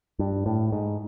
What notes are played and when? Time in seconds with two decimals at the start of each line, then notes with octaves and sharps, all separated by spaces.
0.19 G2
0.46 A2
0.72 G#2